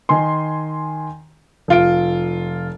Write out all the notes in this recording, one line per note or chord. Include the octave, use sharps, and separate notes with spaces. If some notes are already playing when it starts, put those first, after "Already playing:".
D#3 G#5 C6
F1 F4 D7